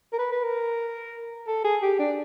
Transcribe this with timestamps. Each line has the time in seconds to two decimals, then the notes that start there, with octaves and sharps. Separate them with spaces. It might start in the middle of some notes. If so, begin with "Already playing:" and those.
0.13 A#4
0.19 B4
0.32 B4
0.44 A#4
1.47 A4
1.64 G#4
1.82 G4
1.99 D4